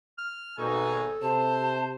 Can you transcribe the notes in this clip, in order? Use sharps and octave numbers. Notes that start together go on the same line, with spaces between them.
F6
G#1 B2 D#4 A4 G#5 C#6
C3 C5 A5